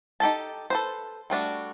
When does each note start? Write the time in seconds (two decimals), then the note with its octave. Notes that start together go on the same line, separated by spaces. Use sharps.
0.20 D#4 G4 A4 A5
0.70 A4 B4 C5
1.30 G3 A3 D4 F#4